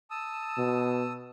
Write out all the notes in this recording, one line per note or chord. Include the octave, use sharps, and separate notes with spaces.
A5 D#6 E6
B2